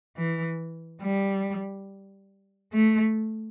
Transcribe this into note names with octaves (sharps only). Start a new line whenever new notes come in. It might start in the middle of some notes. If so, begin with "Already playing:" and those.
E3
G3
A3